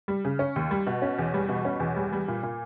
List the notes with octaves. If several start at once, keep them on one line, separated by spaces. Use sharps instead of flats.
G3
C#3
C#4
D#2
G3
B2
C#4
E2
G3
B2
C#4
E2
G3
G3
A#2
A#2